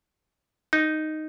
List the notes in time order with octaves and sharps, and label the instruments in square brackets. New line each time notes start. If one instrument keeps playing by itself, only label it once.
[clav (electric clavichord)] D#4